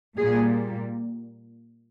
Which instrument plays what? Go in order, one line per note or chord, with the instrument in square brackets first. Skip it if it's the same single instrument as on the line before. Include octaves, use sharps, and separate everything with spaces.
[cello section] A#2 G3 A#3 G#4